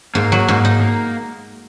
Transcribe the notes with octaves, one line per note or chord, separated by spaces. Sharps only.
G#2 A#3
F#3
G#2
D#4
A#3